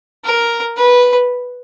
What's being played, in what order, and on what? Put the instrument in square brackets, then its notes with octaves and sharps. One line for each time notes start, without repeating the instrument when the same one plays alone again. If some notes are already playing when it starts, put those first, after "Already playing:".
[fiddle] A#4
B4